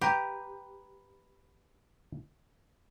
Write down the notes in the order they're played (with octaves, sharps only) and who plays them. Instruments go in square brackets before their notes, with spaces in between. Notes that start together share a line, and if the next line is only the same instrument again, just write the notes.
[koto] G4 [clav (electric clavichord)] B4 A#5